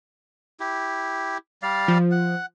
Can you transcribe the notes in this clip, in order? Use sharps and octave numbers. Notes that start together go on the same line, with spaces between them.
E4 G4
G3 D5 F5
F3
F#5